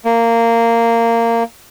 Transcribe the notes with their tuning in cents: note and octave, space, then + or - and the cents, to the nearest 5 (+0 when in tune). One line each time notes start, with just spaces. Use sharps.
A#3 -15